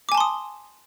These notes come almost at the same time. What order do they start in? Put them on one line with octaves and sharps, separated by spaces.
D6 G#5 A5 C6 D#6